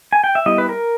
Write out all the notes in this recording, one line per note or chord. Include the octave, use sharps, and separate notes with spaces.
G#5
G5
E5
G3 B3 E4 D#5
B4
A#4